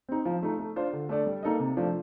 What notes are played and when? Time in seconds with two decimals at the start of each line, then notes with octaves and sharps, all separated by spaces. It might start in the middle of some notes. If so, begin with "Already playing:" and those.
0.09 C4 D#4
0.25 F3
0.42 A3 D#4
0.59 A3
0.76 D4 F4 C5
0.93 D3
1.09 A3 D4 A4 D5
1.26 G3
1.43 A#3 D#4 A4 D#5
1.60 C3
1.77 F3 A3 D4